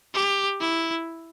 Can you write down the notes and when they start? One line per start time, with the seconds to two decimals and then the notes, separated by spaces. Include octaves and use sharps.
0.14 G4
0.61 E4